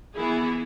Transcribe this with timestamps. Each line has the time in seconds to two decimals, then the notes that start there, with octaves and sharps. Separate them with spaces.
0.16 E3 B3 E4 G#4